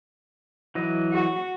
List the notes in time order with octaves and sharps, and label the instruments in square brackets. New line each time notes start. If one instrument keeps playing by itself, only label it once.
[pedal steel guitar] E3 F#3 D#5
[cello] F#4